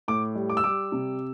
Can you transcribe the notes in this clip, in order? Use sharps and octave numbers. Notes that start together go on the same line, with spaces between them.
A2 D6
G3
D6
E6
G3 D6
C3